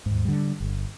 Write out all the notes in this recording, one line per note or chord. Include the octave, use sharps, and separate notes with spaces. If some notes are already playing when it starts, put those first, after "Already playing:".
D#2 G#2
D3 G3
G1